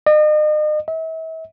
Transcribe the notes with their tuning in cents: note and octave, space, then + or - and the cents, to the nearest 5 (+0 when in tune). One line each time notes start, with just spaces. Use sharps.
D#5 -40
E5 -40